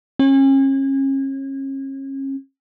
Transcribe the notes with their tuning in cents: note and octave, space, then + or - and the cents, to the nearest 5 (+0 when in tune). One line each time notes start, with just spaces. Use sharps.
C#4 -35